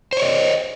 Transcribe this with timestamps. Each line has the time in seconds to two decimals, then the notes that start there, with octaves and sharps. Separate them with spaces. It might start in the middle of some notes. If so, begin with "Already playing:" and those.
0.13 C5
0.17 C#5
0.22 D#5